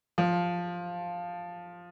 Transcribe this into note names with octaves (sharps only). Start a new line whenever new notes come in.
F3